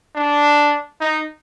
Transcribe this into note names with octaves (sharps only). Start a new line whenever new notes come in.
D4
D#4